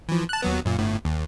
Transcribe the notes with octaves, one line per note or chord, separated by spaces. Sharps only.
E3 F3
A5 F#6
D#2 F#3 B3
F#2 A#2
G1 A2
D#2